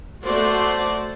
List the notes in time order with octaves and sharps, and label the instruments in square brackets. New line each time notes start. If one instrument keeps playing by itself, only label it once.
[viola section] A3 F#4 C5 D5